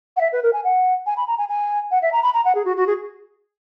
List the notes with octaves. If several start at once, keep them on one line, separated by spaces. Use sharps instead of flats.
F#5
E5
B4
A#4
G#5
F#5
G#5
B5
A#5
G#5
G#5
F#5
E5
A#5
B5
A#5
F#5
G#4
F#4
F#4
G#4